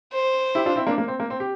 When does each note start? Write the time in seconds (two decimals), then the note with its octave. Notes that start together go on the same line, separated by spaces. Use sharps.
0.12 C5
0.55 E4 G4
0.66 D4 F4
0.76 C4 E4
0.87 A#3 D4
0.98 A#3
1.08 C4
1.20 A#3
1.30 C4
1.40 G4